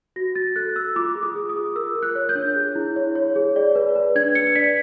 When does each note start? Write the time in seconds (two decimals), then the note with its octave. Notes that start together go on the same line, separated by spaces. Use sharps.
0.16 F#4 A#6
0.35 F#4 A6
0.56 A4 F#6
0.76 A4 E6
0.96 F4 D6
1.15 G#4
1.23 D#6
1.35 G#4
1.49 D#6
1.56 F4
1.76 A#4 E6
1.95 A#4
2.02 F#6
2.15 C#5
2.29 G6
2.35 D4
2.56 G#4
2.76 E4
2.96 C#5
3.15 C#5
3.36 G#4
3.56 D5
3.75 B4
3.96 B4
4.15 D4 G#6
4.35 B4 C#7
4.55 D5 B6